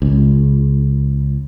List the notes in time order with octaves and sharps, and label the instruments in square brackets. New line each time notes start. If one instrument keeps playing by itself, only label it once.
[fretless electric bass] C#2